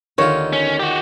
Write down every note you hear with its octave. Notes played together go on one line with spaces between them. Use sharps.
D#2 D3 D#3 F4 C#5
C#4
F#4 G4